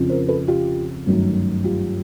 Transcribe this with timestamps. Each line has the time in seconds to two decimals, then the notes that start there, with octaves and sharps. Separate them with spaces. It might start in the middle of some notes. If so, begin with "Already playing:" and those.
Already playing: F2 C#3 F3
0.09 A#4 C5
0.28 A4 B4
0.48 F4 G4
1.06 G1 F#2 D#3 F#3 A3
1.64 F4 G4